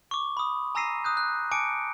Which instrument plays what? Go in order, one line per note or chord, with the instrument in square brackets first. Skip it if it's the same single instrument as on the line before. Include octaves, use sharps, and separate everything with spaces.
[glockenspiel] C#6 D6
B5 D#6
G#5 A#5 E6 A#6 C7 D#7
D#6 F#6 G6
F#6
G#5 A5 D6 C#7 D7